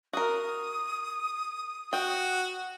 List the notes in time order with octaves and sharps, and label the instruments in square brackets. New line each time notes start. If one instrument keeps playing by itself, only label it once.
[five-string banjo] F#4 A#4 [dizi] D#6
[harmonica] F#4 [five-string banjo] G5